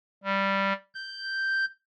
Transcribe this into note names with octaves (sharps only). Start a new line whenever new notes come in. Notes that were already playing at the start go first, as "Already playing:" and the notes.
G3
G6